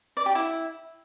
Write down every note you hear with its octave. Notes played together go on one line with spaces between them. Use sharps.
D5
G4
E4